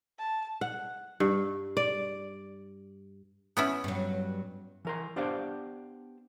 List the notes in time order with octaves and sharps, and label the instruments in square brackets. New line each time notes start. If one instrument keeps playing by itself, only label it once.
[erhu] A5
[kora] F#5
G2
D5
[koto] B3 C#4 E4
[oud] G2 F#3
[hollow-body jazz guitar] E3 A#4 C6
B3 D4 G4 C5 D5 F5